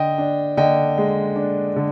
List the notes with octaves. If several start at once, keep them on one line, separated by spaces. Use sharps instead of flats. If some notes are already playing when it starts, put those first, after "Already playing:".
Already playing: D3 D#5 G5
D4
D3 D#5 G5
G#3
D4
D3